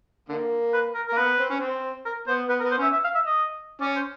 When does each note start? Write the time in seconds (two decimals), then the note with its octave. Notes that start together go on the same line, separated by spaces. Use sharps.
0.29 D3 A#3
0.73 B4
0.95 A#4
1.08 A#4
1.12 A#3
1.17 B3 B4
1.38 C4
1.50 C#4
1.60 C4
2.05 A#4
2.27 B3 C5
2.49 B3 B4
2.60 A#4
2.64 B3
2.72 C5
2.78 C#4 E5
2.93 E5
3.04 F5
3.15 E5
3.26 D#5
3.81 C#4 D5
3.96 C5